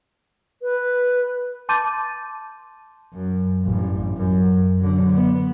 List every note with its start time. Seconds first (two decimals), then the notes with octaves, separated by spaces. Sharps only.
0.62 B4
1.69 A5 C6 D6 G6 A6 D#7
3.14 F#2
3.65 A1 G2
4.17 F#2
4.79 D3 F#3
5.15 B3